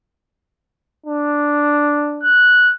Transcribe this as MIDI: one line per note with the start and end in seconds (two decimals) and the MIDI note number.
1.06 2.31 62
2.24 2.74 90